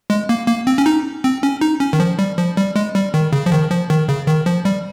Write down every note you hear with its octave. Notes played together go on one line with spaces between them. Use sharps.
G#3
A#3
A#3
C4
C#4
D#4
C4
C#4
D#4
C#4
D#3
F3
G3
F3
G3
G#3
G3
D#3
C#3
F3
D#3
F3
D#3
C#3
D#3
F3
G3